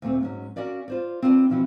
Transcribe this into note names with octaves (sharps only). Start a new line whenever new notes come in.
D2 A#2 A3 C4
G#2 F#3 C#4
C#4 F#4 A#4 D5 F5
F4 C5 D5
C4 D4 F4 A4 B4 D5
B2 E3 F3 C4 E4 F#4